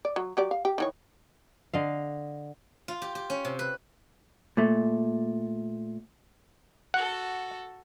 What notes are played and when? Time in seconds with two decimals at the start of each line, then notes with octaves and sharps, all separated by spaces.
0.05 D5
0.16 F#3
0.37 F#3 G4 D5
0.51 F5
0.65 G4
0.78 D#3 E3 C#5
1.73 D3 D#5 F5
2.88 F4
3.02 G4
3.15 G4
3.30 C#4
3.45 C3
3.59 B4
4.57 A#2 A3
6.94 F#4 A4 F#5